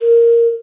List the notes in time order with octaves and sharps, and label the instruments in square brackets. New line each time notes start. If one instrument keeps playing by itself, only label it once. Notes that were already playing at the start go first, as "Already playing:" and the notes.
[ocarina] A#4